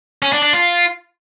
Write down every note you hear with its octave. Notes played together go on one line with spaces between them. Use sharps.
C#4
D4
D4
F4